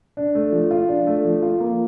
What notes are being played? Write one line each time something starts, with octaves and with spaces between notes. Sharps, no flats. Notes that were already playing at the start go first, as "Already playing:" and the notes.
D4
A3
F3
F4
D4
A3
F3
F4
A#3